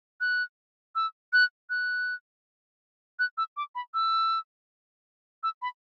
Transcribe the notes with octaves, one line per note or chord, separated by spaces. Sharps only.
F#6
E6
F#6
F#6
F#6
E6
D6
B5
E6
E6
B5